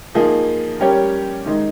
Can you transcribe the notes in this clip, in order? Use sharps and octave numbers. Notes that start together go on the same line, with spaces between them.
F3 A#3 D#4 G#4
G3 C#4 G4 A#4 C#5
D#3 G#3 D#4